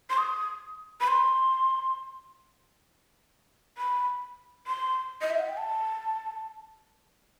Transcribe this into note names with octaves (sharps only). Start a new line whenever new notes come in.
C6
D#6
B5
C6
B5
C6
D#5
E5
F#5
G5
A5